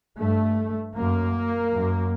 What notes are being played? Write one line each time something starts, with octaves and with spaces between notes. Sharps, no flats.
G2 A3
F#2 A#3
F#2